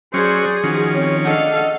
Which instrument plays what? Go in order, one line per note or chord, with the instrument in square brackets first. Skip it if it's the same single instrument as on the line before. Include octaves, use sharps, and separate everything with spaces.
[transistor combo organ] F#3 C#4 [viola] G#4 [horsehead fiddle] C5 D5
[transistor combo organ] D#3 F3 C#4 [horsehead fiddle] F#4
[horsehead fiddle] C4 [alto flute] C#5
[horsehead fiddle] D4 D#5 [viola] A4 F5 [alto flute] F#5